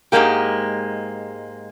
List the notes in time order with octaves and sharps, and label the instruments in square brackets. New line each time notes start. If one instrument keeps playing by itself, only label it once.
[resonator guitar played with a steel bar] G#2 E3 G#3 A#3 G4